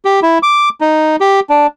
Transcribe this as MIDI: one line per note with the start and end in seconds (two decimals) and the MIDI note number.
0.05 0.20 67
0.23 0.38 64
0.43 0.69 86
0.81 1.16 63
1.21 1.40 67
1.50 1.67 62